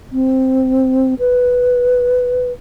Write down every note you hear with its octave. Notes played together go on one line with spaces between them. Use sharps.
C4
B4